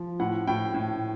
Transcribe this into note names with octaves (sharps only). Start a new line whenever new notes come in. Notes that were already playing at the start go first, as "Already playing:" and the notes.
Already playing: F3
A2 F#5
A2 G5
A2